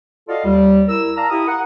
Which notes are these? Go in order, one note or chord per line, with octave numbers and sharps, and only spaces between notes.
F4 F#4 A4 D5 D#5 F5
D#2 G3
E4 A#4 E6
D5 F5 A5 A#5
E4 G4 F5 D#6
A#4 F#5